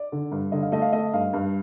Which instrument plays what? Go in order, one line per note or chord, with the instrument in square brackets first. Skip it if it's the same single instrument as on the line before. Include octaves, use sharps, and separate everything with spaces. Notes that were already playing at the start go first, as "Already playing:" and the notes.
Already playing: [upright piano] D5
D3
G2
D3 D#5
F5
A3 D#5
F5
A3 D#5
G2 F5
G2